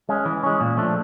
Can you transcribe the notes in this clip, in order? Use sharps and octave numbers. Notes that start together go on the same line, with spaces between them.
G#3 C#4
E3
G#3 C#4
A#2
F3 A3 D4